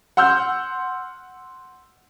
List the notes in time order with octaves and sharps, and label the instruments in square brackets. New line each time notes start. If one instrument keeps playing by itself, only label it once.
[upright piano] F#5 C6 E6 F6 G6